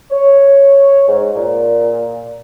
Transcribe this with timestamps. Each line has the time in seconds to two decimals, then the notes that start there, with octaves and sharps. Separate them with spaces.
0.11 C#5
1.07 G#2
1.35 A#2